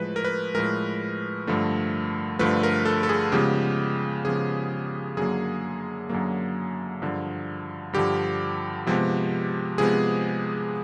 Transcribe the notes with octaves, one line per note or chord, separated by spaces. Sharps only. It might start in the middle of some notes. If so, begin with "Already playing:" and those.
Already playing: A2 F3 G#3 B4
A#4
B4
A2 F3 G#3 A#4
G2 D3 F3 A3
G2 D3 F3 A3 B4
A#4
A4
A4
G#4
C#3 F3 G#3 B3 G4
C#3 F3 G#3 B3 G#4
F#2 D3 F#3 A#3 G#4
F#2 D3 F#3 A#3
G2 D3 F3
G2 D3 F3 G4
C3 F3 G#3 B3
C3 F3 G#3 B3 G#4